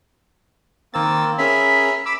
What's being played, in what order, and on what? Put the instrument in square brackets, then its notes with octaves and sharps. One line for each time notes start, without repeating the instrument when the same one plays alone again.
[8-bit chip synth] D#3 E6 A6 [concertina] A#3 C4
[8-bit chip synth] C#4 G#4 A#4 [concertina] E5 B5
[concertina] B5 D6 E6